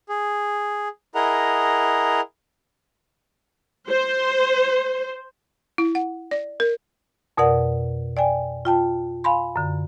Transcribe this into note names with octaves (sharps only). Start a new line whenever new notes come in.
G#4
E4 G#4 A#4 D#5 F#5 A#5
C5
E4
F#5
D5
A#4
F2 B2 A#4 D5 F#5
D5 G5 G#5
F4 G5 A5
F5 G#5 B5 C6
F#2 D3